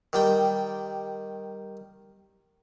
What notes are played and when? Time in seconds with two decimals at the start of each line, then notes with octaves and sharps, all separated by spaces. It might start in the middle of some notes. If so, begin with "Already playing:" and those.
0.13 D#3 G3 G5